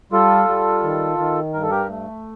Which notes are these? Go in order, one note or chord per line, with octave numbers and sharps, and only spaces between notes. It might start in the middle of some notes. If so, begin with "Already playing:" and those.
G3 F4 A4
G3
D#3
D#3
G2 A#4
A4
G4 A#4
A3